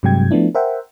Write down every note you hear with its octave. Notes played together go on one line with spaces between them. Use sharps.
G2 C3 F#3 G#3 G5 G#6
F3 A3 B3 D4 E4
A#4 C5 E5 F#5 G5